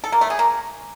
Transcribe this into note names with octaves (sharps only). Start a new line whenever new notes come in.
A4
A#3
A3
G#4
A#3